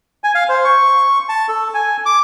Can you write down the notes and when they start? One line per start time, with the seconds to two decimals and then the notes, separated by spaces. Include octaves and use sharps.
0.24 G#5
0.35 F5
0.49 C5
0.65 C#6
1.29 A5
1.49 A4
1.74 G#5
2.06 D6